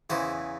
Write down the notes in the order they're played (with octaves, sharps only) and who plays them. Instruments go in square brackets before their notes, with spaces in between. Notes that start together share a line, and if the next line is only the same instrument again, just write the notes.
[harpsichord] E2 C#3 E3 C5